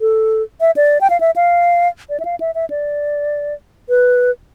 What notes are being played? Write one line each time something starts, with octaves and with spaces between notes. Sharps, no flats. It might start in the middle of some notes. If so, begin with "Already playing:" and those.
A4
E5
D5
G5
F5
E5
F5
D5
E5
F5
E5
E5
D5
B4